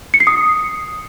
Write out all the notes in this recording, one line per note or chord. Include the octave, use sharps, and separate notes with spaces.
C#7
C7
D#6